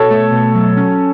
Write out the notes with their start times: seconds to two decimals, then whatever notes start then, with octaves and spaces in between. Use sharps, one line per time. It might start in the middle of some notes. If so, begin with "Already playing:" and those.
Already playing: B2 A4 C#5
0.10 A3
0.32 B2
0.55 F#3
0.77 C#4